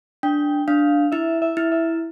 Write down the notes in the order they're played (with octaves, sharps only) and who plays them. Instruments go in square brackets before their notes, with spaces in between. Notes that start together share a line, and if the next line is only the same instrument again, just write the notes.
[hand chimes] D4 [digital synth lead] G5
[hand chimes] D4 [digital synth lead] F5
[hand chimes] E4 [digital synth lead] E5
[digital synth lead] E5
[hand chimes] E4
[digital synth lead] E5